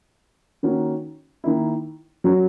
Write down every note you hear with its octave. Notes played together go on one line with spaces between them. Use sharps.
D#3 A#3 C#4 F#4
D#3 A#3 E4
F#3 C#4 F#4